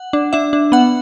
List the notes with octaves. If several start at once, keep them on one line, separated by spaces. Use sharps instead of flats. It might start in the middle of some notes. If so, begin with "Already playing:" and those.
Already playing: F#5
D4
D4 E5
D4
B3 F#5